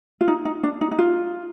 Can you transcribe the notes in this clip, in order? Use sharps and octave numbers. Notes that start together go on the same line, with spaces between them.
F4
D#4
D#4
D4
D#4
D#4
F4